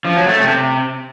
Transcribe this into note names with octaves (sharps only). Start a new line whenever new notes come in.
F3
F#3
A3
C3